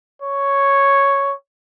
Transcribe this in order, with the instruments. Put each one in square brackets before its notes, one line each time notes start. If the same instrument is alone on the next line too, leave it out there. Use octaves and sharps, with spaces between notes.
[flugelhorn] C#5